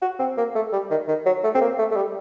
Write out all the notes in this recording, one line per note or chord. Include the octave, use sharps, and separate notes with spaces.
F#4
C4
A#3
A3
G3
D#3
D#3
F#3
A3
C4
A#3
A3
A3
G3